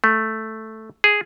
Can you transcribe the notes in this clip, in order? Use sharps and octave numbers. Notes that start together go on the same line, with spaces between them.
A3
G#4